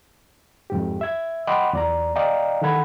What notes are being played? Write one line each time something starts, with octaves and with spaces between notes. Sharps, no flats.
F2 G#2 G4
E5 G#6
D#5 F#5 G5 B5 C6 D6
E2 D5 A#5
D5 D#5 F5 G5 A#5
D#3 E3 A4 F#5 B5 G#6